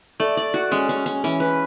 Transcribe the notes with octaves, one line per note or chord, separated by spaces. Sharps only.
A3 D5
D5
F#4
G#3 C#4
C#4
C#4
E3 C#4
B4